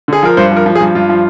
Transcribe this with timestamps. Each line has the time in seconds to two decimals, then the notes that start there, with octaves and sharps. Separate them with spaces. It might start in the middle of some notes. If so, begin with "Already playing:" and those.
0.08 D3 G#4
0.23 F3 A#4
0.37 G2 C5
0.51 F3 A#4
0.66 F3
0.75 G#4
0.81 G2
0.95 G2 F4
1.09 F3